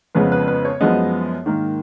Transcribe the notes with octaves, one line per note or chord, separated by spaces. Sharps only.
F2 C#3 F3 G#3 B3 B4
B4
B4
C#5
F#2 F3 G#3 B3 D#5
G#2 D#3 A#3